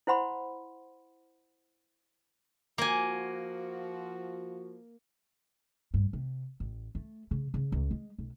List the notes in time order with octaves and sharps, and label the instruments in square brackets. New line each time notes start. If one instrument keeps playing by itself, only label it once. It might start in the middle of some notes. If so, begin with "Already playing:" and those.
[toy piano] E4 C5 F#5 B5 C6
[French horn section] F3 F#4 [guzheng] A#3 G#5
[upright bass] G2
C3
A1
A3
C#3
C#3
C#2
G#3
B1